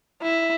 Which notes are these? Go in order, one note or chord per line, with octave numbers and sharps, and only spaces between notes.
E4